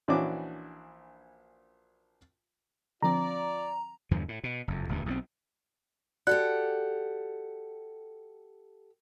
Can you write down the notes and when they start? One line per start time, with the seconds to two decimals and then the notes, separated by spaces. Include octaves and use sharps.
0.08 A#1 E3 C#4 D4 F#4 D6
3.02 D3 F3 C4 F4 D5 A#5
4.11 E2 G2 D3 F3
4.28 A2
4.44 B2
4.68 F#1 F2
4.89 D#1 D2 G2
5.06 B1 A2 C4
6.27 F#4 G4 A4 D5 F#5 F#6